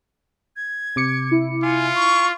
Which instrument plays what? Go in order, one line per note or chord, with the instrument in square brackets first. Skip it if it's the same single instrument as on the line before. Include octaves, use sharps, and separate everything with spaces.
[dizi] G#6
[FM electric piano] C3 D6 C#7
[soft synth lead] E4
[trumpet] F4 [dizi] G#5
[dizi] C#6